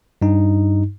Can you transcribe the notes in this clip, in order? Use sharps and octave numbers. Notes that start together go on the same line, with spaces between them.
G2 D#4